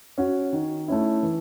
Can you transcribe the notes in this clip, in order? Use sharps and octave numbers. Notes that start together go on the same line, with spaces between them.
C#4 F#4
D#3
A3 C#4 E4
E3